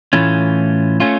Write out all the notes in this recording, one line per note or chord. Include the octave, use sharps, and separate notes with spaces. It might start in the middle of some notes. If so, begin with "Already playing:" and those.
A2 E3 A3 C#4 F4
A3 C#4 F4